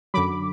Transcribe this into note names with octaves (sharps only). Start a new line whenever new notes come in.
F#2 D3 F#3 B5 D6